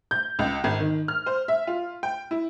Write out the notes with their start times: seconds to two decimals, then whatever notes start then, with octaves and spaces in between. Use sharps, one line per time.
0.11 G6
0.39 C#2
0.64 G#1
0.80 D#3
1.08 F6
1.26 C5
1.48 E5
1.67 F4
2.03 G5
2.31 E4